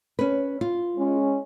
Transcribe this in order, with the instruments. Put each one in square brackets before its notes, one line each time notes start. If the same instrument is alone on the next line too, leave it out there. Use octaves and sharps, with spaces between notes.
[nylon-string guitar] C#4 B4
F4
[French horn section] G#3 C#4